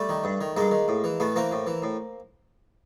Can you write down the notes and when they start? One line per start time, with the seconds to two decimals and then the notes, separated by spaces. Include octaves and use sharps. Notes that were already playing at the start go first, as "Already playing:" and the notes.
Already playing: G3 A3
0.09 D#3
0.24 G2
0.41 D#3
0.57 G2 G#3 A#3
0.71 D#3
0.88 A2
1.04 E3
1.20 A2 A3 B3
1.36 E3 A#3 C4
1.52 A2
1.67 E3
1.82 A2